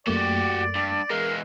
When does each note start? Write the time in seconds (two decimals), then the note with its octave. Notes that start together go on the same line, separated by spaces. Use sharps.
0.07 F#2 A3 A#3 F#4 G4 D5
0.75 G2
1.10 E3 G#3 A#4 F5